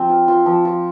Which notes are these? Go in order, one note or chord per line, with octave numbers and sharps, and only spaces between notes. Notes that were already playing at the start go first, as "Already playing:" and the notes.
Already playing: F3 C4
F4
F4
F3
F4